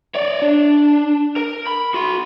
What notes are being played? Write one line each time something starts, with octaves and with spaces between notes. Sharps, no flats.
C#5 D5
D4
A#4
B5
F#4 C6